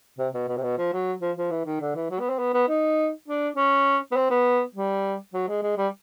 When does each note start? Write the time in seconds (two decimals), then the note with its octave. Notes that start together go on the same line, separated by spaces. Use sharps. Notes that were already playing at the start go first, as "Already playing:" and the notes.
0.18 C3
0.34 B2
0.48 B2
0.57 C3
0.63 B2
0.78 F3
0.93 F#3
1.21 F3
1.37 F3
1.51 E3
1.66 D#3
1.81 D3
1.96 E3
2.11 F#3
2.20 B3
2.29 C4
2.39 B3
2.54 B3
2.68 D#4
3.28 D4
3.56 C#4
4.12 B3
4.16 C4
4.30 B3
4.75 G3
5.34 F#3
5.48 G#3
5.63 G#3
5.78 G3